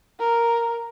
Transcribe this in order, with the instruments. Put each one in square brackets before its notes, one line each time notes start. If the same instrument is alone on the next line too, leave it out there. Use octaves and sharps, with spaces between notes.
[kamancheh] A#4